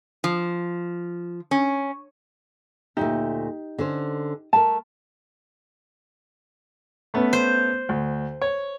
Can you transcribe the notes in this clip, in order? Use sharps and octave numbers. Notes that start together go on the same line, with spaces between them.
F3
C#4
D2 A#2 A3 D#4 G4
D3 C#4 C5
A3 A#4 A5
A3 B3 C#4
C5
D2
C#5